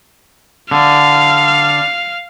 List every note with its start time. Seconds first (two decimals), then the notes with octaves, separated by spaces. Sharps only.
0.71 D3 F5